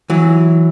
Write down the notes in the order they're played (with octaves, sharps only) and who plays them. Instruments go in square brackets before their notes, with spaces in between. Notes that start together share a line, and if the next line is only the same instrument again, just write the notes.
[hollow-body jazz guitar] E3 F#3